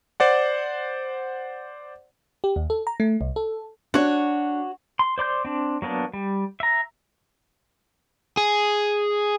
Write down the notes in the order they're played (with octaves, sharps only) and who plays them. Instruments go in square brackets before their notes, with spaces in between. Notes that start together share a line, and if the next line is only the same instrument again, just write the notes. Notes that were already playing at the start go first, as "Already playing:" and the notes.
[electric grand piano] C5 D5 F#5
[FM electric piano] G4
D#2
A4
A#5
A3
C2
A4
[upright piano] D4 [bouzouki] F#4 C#5
[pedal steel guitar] C6
C5 D5 C6 G6
C4 D4
F#3 A#3 B3 D4
G3
E5 A#5
[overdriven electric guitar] G#4